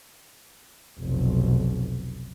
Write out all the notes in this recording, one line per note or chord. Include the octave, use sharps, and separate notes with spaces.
F1 B1